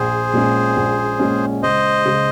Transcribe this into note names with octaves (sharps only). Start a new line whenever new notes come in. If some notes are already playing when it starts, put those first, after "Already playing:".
Already playing: A#1 G#4 C5
A#2 G#3 C#4
A#1
A#2 G#3 C#4
C#2 C5 D#5
C#3 G#3